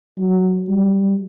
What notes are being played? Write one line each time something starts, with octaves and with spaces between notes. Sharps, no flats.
F#3
G3